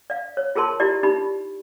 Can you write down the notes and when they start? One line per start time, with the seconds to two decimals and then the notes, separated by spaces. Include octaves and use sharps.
0.10 D5 F5
0.37 C#5
0.55 F4 G#4 A#4 A5 C6
0.80 E4 F4 G4 D5
1.03 D#4 G4 B5